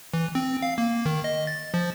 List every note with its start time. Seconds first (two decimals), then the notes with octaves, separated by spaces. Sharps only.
0.14 E3
0.35 C4
0.62 F5
0.78 A#3
1.06 D#3
1.24 D#5
1.47 A6
1.74 F3